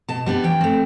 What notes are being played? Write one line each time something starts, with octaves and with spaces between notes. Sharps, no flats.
B2 A5
G3 B3 D4
E3 G5
A3 C4